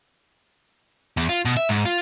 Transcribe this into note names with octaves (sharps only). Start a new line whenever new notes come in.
E2
F4
B2
E5
G#2
F4